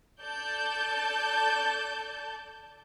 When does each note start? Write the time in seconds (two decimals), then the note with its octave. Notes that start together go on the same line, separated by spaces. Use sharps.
0.22 A4 D5 A5 G6